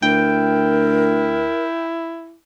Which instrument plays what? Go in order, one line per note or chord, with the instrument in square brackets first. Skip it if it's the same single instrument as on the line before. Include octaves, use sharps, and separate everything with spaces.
[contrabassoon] D2 [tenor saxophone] E4 [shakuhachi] A#4 [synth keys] G5